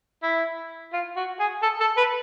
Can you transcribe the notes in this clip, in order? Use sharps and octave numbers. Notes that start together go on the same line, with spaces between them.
E4
F4
F#4
G#4
A4
A4
B4